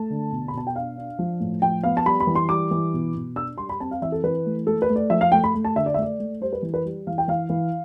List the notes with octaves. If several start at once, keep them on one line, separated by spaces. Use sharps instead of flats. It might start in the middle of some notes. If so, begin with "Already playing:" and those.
Already playing: A3 A5
D3
B2
B5
B2 A5
G5
D4 F5
D4
F3
A2
F3 G5
B3 F5
A5
G3 B5
B5
E3
C6
G3 D6
E3
B2
B2
D4 E6
G3 C6
B5
C4 A5
F5
E3 E5
A4
E3 B4
A3
A3 A4
B4
A3
D5
F3 E5
F5
A3 G5
B5
A3
A5
D3 E5
D5
E5
A3 D5
A3
G3 C5
B4
E3
B4
G3
E3 F5
G5
E3 F5
E3